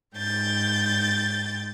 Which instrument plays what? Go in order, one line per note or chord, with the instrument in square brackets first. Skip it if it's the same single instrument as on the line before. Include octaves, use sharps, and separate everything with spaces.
[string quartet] G#2 G5 G6 A6